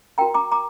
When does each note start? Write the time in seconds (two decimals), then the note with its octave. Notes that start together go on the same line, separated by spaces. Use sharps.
0.18 F#4 A#4 G5 A#5
0.34 A#5 D6
0.52 A#5 D6